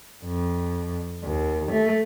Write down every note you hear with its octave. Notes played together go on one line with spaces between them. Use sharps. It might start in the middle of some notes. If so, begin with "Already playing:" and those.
F2
D#2
A3